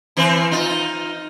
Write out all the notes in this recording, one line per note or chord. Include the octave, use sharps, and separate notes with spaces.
E3 C4 B4
D#4 F4